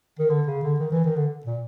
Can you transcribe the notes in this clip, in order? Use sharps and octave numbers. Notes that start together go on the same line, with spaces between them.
D#3
D3
C#3
D3
D#3
E3
D#3
D3
A#2